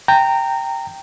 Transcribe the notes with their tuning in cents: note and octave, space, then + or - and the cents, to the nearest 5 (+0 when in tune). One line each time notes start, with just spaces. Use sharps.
G5 +0 A#5 -20